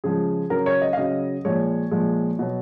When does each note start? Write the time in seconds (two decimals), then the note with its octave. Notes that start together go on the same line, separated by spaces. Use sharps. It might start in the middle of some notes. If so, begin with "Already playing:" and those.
0.04 C#3 F3 G#3 G#4
0.50 C#3 F#3 A#4
0.66 C#5
0.82 D#5
0.93 F5
0.97 C#3 F#3 D#5
1.45 A#2 F3 G#3 C#5
1.91 A#2 F3 G#3
2.39 B2 F#3